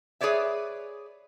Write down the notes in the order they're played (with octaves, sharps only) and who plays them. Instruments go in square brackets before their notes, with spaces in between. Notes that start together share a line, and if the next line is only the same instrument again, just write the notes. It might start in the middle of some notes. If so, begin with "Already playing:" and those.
[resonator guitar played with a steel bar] G#4 B4 C#5 D5 E5